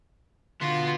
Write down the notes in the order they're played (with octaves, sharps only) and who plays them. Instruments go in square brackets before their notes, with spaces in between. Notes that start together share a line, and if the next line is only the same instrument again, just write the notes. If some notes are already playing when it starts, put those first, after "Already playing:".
[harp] D3 D4 [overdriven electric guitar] B3 F#4 [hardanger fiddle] F4 [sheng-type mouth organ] C6